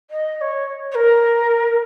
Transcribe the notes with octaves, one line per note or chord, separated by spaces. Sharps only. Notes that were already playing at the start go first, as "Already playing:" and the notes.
D#5
D#5
C#5
C#5
A#4